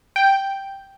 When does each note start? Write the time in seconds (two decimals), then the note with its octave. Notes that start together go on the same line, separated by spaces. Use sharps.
0.16 G5